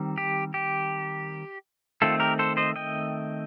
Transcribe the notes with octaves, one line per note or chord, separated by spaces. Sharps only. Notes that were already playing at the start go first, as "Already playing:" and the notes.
Already playing: D#3 G3 C4
G4
G4
D#3 A3 C4 F4 A4
G4 A#4
A4 C5
C5 D#5
D#5 G5